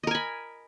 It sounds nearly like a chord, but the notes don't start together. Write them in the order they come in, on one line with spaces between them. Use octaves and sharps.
D#5 A#4 G#5 B5